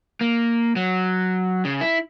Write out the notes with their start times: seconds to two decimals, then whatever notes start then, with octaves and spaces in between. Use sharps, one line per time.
0.21 A#3
0.76 F#3
1.65 C#3
1.81 E4